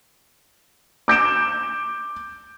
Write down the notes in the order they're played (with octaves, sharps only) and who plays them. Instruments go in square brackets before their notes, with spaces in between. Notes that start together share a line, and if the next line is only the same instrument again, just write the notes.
[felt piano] D6 G6 D7 E7